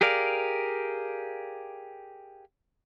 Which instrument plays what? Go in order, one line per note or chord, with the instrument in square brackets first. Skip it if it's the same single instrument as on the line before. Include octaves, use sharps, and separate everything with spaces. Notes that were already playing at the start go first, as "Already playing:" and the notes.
[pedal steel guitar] G4 G#4 A#4 D5 F5